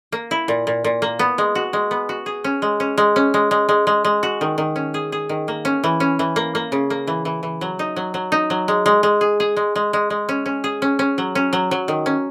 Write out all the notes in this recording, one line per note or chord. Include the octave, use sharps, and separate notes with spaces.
A#3
E4
A#2
A#2
A#2
A#3
B3
G#3
F#4
G#3
B3
F#4
G#4
C#4
G#3
C#4
G#3
C#4
G#3
G#3
G#3
G#3
G#3
F#4
D#3
D#3
C#4
G#4
G#4
D#3
A#3
C#4
E3
C#4
E3
A#3
A#3
C#3
A#3
E3
E3
E3
F#3
D#4
F#3
F#3
D#4
F#3
G#3
G#3
G#3
G#4
G#4
G#3
G#3
G#3
G#3
C#4
C#4
G#4
C#4
C#4
F#3
C#4
F#3
F#3
D#3
C#4